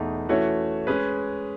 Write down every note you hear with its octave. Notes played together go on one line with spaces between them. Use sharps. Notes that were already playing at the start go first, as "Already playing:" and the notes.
Already playing: E2 B2 A3 D#4
E3 A3 C#4 F#4 C#5
G#3 C#4 G#4 B4